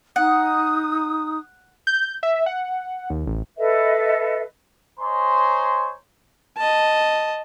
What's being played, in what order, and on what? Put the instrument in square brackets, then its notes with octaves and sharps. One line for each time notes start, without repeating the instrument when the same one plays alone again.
[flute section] D#4 D#6 [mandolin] F#5
[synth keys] G6
E5
F#5
D#2
A1
[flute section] A4 B4 D#5 E5
[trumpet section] C5 C#5 D#5 G#5 A#5 C6
[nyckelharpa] D#5 A5